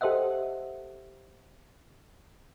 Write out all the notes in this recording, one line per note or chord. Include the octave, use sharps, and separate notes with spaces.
G4 A4 C5 D#5 E5 F#5